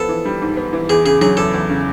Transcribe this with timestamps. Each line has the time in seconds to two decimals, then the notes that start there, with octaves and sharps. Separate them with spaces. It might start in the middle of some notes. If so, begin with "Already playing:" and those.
Already playing: F3 B3 A4
0.08 E3
0.25 G3
0.42 G#2
0.56 B3
0.73 E3
0.89 E2 G#4
1.05 C#3 G#4
1.21 F#3 G#4
1.37 E2 A4
1.54 E2
1.70 C#3